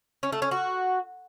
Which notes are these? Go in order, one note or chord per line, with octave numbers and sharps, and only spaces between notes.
C#4
A3
C#4
F#4